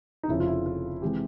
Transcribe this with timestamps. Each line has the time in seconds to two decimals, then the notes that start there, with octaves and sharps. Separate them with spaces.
0.23 D#4
0.28 F1 F2 C#3 F3 E4
0.40 F4
0.47 E4
0.66 F4
1.02 C3 E3 G#3 G4